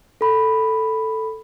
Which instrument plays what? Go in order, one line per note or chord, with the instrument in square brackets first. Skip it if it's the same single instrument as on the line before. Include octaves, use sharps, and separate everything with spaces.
[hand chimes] A4 B5